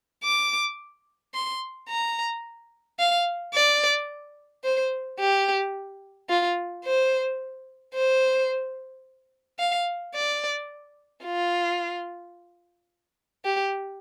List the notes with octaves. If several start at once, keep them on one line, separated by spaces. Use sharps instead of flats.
D6
C6
A#5
F5
D5
C5
G4
F4
C5
C5
F5
D5
F4
G4